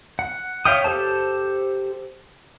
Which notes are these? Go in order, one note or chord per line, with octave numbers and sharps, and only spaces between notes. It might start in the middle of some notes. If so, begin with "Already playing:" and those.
F#5
C#5 E5 F5 G5 D#6
G4 A4 C5 A5